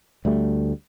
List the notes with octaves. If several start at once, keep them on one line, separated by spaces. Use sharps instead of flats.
D2 G3 A3